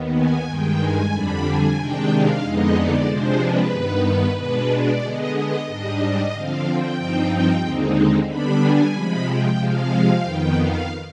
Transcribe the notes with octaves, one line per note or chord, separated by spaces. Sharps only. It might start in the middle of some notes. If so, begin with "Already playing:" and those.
Already playing: D#2 D#3 B3
G#5
G2 D#3 G#3 G5
G#5
F2 D3 G3 D4 B5
G#5
C3 D#3 G#3 D4 G5
F5
F2 D3 G#3 B3 D#4 D#5
D5
C3 F3 G#3 D4 C5
B4
G2 D#3 B3
B2 G#3 B3 D4 B4
D5
D3 G#3 B3 D#5
D#5
G#2 G3 D4 D#5
D3 F3 C4 F5
G5
G2 F3 C4 D#4
D#2 D3 G#3 C4 D#4
D3 G3 B3 D4 B5
G#5
C3 F3 G#3 B5
G5
C3 F3 G#3 F5
F2 D#3 B3 G5
F5